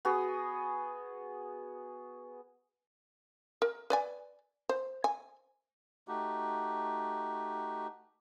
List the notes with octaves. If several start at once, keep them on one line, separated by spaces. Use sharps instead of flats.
B3 F#4 G#4
A#4
B4 D5 G#5
C5
G#5
A3 D#4 F#4 G4